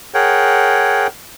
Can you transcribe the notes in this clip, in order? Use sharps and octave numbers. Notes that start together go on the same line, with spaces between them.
G#4 A#4 C#5 F#5 G5